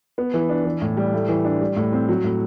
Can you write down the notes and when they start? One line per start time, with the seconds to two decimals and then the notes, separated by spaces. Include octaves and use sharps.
0.18 B3
0.34 E3
0.49 D4
0.65 E3
0.82 A2
0.97 G3
1.13 A3
1.29 E3
1.45 D4
1.61 G3
1.77 A2
1.93 C4
2.08 F#3
2.24 A2